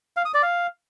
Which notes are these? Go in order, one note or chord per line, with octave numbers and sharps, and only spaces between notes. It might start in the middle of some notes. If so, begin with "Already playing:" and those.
F5
D#6
D5
F5